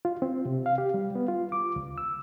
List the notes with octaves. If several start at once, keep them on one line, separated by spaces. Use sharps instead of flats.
F4
C4
C3
F5
G4
G3
B3
F4
D6
C#2
E6